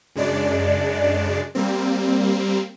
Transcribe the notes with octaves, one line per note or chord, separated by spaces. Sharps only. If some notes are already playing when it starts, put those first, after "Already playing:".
F#2 C#3 G#3 D4 D5
G3 A#3 C4